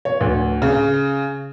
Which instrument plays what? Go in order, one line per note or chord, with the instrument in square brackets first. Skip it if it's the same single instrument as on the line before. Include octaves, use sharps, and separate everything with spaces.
[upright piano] C#5
D2
C#3